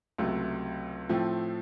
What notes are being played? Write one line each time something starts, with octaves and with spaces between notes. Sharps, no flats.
C#2 C3 F#3 A3
A2 F3 A3 C4